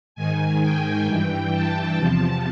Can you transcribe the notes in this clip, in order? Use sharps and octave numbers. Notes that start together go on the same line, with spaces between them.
G#2 D#3 G#5
G5
G2 E3
A5
E2 C3 F3 A5